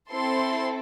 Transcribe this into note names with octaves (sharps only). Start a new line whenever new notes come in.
C4 E4 A4 C6